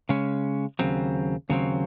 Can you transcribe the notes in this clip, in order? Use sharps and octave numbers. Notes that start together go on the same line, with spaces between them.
C#3 G#3 C#4
D#2 C#3 F#3 C4
D#2 C#3 F#3 C4